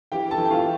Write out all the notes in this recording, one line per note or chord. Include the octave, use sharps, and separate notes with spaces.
E3 G4 G5
A4 A5
E3
G5
F4 F5